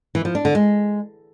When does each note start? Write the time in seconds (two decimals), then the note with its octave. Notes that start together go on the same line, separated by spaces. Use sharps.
0.15 E3
0.25 F3
0.35 D4
0.45 D3
0.55 G#3